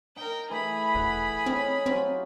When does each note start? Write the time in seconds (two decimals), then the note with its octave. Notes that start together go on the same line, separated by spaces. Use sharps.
0.16 D#4 A#4 G5
0.50 E3 A3 E4 G#4 B5
0.95 E1 F#5
1.46 C4 C#4 D#4
1.86 F#3 C4 F4 G4